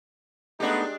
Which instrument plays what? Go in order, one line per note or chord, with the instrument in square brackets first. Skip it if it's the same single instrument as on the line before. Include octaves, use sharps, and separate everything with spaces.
[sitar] G#3 D4 G4 [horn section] A3 B3 D#4